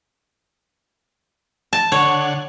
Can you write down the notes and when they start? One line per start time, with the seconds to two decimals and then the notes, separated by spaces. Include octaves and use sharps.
1.73 A5
1.92 D3 C#5 F#5